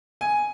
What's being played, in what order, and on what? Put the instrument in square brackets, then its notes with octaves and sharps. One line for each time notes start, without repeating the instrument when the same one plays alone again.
[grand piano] G#5